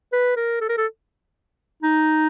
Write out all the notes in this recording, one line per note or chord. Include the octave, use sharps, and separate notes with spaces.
B4
A#4
A4
A#4
A4
D#4